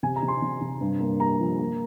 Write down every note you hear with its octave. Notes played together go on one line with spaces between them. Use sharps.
C3 G#5
A#5
C3
C6
C3
C3
G2
A#3
A#3 A#5
F3
A#3